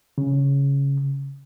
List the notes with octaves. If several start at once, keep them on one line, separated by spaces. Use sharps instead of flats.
C#3